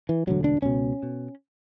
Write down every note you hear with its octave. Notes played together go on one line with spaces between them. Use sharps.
E3
E1 D2 D3 F#3
D4
C#2 B2 C#4
B2